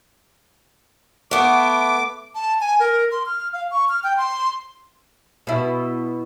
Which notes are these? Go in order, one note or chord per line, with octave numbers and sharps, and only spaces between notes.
A3 B3 D6
A5
G#5
A#4
C6
F6
F5
C#6
F6
G5
C6
B2 E4